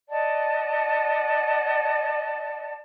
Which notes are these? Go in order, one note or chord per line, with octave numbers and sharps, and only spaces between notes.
D5 D#5 F#5 A5